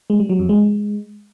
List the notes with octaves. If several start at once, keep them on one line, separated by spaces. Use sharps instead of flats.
G#3
G3
F#3
F2
G#3